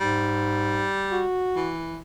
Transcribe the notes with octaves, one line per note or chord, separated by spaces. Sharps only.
G#2 G3
F#4
E3